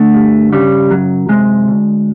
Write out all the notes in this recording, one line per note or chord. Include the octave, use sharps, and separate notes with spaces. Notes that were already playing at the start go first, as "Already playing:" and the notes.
Already playing: D3 A3
G2
C#3 G3
F#2 F#3
C3 G#3
D2